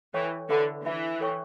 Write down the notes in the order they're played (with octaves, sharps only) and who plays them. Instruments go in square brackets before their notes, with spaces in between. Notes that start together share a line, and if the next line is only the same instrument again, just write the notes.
[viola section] E3 [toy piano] A4 C#5 G5 C#6
[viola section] D3 [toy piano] B4 E5 B5
[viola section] E3 [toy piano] B4 E5 B5
[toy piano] A4 C#5 G5 C#6